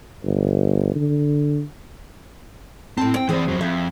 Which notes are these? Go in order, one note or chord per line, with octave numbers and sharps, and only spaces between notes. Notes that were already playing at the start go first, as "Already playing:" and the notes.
G1
D3
A2 C4 A5
C4 G5
E3 C4 G#4 C5 D5
F2 F#3
F2 E5